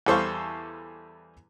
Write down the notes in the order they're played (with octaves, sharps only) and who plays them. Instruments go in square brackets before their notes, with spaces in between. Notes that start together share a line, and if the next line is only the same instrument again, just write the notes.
[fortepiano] E2 G3 A4 C5 F5 C#6